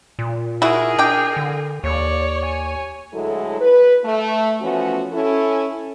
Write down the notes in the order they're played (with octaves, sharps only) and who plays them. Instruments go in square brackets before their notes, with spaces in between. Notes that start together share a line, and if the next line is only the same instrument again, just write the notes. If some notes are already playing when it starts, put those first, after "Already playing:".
[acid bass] A#2
[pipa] E4 F#4 [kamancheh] G#4 A#4
[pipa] D4 G5
[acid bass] D3
[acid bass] D#2 [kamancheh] C#5 D5
[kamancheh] C#5 G#5
[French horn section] D2 F#3 G#3 E4 A4
B4
A3
E3 F3 A3 B3 C#4 F#4
C#4 E4 A4